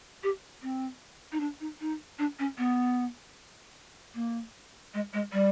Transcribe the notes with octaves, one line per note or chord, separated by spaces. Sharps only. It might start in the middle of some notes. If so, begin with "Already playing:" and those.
G4
C4
D#4
D4
D#4
D#4
D4
C#4
B3
A#3
G#3
G#3
G3